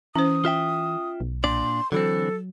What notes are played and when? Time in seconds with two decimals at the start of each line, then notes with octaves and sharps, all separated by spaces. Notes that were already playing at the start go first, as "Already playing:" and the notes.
0.16 E3 C#4 C5 D#6
0.45 F4 E5 G5
1.20 B1
1.44 A#2 D4 D5 C6
1.92 D3 E3 F#3 C4 A4